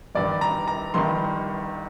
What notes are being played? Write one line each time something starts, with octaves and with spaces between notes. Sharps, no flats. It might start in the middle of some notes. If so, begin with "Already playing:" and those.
G1 G2 D#3 D5
A#5
A#5
G1 G2 D#3 C6